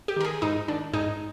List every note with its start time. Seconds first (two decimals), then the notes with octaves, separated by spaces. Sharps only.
0.08 G4
0.16 D#3 A#4
0.25 G#4
0.42 G#2 D#4
0.68 D#3 D4
0.93 G#2 D#4